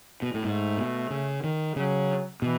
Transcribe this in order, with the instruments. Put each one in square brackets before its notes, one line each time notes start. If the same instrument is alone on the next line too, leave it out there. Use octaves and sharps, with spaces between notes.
[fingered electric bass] B2
A2
[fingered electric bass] G#2 [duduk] A3
[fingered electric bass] B2
C#3
D#3
[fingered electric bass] C#3 [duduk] F#3
[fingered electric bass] B2 [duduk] E3